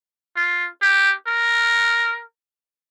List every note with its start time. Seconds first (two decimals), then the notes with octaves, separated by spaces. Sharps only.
0.36 F4
0.82 G4
1.27 A#4